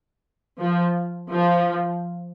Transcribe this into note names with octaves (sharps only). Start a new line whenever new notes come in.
F3
F3